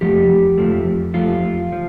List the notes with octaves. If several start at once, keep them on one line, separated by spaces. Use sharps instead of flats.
F2 F3 A3 G4
F2 F3 A3
F2 F3 A3 F4
F3